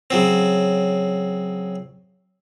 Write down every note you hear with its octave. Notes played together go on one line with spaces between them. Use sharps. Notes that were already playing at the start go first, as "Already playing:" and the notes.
C#3 F#3 C4